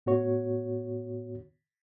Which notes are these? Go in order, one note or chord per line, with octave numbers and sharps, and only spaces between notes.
A2 B3 F#4 C#5